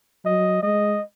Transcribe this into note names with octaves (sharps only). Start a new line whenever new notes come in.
F#3 D#5
G#3 D#5